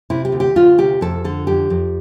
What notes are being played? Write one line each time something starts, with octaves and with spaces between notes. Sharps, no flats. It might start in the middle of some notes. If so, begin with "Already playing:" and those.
C3 E4
G4
D2
G4
D2 F4
C3 G4
F2 A4
D3 A4
F2 G4
F2